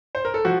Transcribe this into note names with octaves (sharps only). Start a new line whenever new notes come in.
C5
A#4
A4
F3 F#4